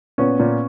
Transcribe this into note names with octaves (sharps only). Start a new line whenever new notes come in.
A#2 B3 C#4
A#2